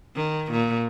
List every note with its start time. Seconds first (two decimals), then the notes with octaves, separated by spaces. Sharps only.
0.16 D#3
0.52 A#2